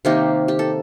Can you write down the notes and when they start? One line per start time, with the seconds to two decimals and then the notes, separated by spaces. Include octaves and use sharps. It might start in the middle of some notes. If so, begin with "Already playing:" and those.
0.05 C3 D#3 A#3 D#4 G4
0.48 G4
0.59 A4